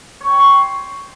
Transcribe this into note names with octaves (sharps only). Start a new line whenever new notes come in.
C#5
G5
C#6
C6